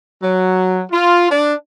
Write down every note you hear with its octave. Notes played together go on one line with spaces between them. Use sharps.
F#3
F4
D4